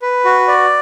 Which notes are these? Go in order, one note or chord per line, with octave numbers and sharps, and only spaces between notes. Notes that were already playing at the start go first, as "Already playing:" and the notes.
B4
F#4
D5